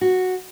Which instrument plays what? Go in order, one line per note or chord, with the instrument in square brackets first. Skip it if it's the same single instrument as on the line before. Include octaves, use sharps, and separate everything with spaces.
[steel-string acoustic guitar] F#4